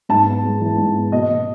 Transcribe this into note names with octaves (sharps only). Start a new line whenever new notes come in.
G#2 A5
B3
G#3
E3
G#2
B3
B2 D#5
B2